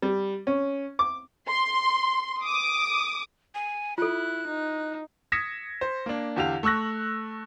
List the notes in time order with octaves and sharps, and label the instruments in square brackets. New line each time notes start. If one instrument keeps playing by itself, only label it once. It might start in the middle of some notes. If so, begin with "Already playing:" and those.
[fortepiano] G3
C#4
D6
[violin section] C6
D6 D#6
[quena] G#5
[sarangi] E4 [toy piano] F4 A4 [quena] F#6
[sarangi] D#4
[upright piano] D#6 G#6 A#6 B6 C#7 E7
C5
A#3 D4
E2 D3 G4 F5 F7
A3 C#6 E6 F#6 A#6